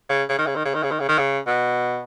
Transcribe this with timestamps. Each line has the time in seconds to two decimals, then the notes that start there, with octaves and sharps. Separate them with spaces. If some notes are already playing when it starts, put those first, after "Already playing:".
0.09 C#3
0.29 C#3
0.38 D#3
0.47 C#3
0.56 D#3
0.65 C#3
0.74 D#3
0.83 C#3
0.91 D#3
1.00 C#3
1.09 D#3
1.18 C#3
1.47 B2